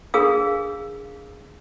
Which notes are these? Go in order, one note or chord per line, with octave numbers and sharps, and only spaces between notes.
D4 G#4 A#4 F5 D#6